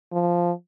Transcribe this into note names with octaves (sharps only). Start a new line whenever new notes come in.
F3